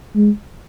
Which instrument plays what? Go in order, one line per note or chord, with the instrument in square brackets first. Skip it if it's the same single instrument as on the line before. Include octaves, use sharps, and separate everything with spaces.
[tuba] G#3